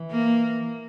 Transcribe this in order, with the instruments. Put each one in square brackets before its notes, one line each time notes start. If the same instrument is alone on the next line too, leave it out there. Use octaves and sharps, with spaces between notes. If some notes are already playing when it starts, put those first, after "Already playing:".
Already playing: [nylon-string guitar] E3
[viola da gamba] A#3